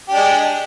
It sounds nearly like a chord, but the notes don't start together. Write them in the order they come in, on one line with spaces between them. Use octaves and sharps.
G4 D4 G#3